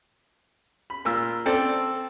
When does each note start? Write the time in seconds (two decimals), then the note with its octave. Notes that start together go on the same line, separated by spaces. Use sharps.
0.90 B5
1.05 A#2 F4 E6
1.46 C4 A4 C5 D5